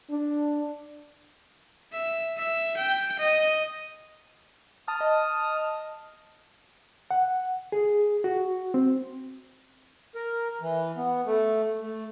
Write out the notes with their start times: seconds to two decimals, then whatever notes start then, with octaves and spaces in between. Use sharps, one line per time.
0.10 D4
1.93 E5
2.37 E5
2.77 G5
3.19 D#5
4.88 A5 D#6 F6
5.01 D#5
7.11 F#5
7.72 G#4
8.24 F#4
8.74 C4
10.15 A#4
10.61 E3
10.97 B3
11.26 A3
11.81 A3